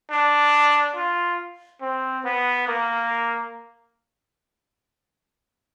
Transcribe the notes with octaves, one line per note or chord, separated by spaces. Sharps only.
D4
F4
C4
B3
A#3